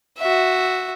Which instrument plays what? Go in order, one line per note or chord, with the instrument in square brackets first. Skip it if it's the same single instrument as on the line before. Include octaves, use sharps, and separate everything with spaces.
[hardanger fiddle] F#4 E5